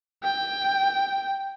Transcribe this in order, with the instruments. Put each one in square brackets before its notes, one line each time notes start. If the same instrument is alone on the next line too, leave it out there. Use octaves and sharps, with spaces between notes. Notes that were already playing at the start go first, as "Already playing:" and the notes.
[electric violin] G5